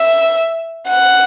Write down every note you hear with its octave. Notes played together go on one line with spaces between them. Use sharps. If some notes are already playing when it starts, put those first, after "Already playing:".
Already playing: E5
F#5